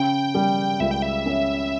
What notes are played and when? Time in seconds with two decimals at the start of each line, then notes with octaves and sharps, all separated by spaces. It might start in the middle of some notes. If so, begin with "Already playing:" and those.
Already playing: C#3 G5
0.35 G3
0.80 C#2 E5
0.91 G5
1.02 E5
1.26 C#4